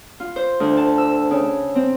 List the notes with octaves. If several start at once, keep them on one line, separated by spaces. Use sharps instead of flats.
F4
C5
D2
A5
E6
C#3
C4